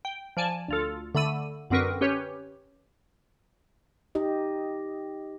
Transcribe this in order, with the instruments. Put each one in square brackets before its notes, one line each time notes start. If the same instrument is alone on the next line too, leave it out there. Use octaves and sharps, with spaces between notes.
[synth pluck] G5
F3 D5 G#5 A5
D2 F4 A4
D3 A3 B5 E6 D#7
F#2 D3 C4 A#4 B4 C#6
C#4 G4 B4 C#5
[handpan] D#4 G4 D#5